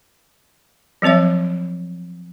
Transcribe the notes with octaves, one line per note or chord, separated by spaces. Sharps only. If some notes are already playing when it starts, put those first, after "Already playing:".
F3 F#3 C4 C#5 E5